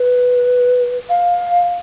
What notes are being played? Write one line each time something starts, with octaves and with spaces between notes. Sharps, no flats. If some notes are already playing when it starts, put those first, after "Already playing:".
Already playing: B4
F5